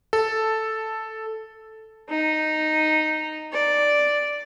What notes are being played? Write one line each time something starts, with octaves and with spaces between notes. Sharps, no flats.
A4
D#4
D5